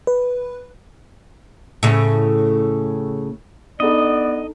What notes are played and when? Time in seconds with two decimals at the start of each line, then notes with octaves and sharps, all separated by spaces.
0.07 B4
1.83 A2 C#3
3.80 B3 D4 D#4 A4 D5 D#5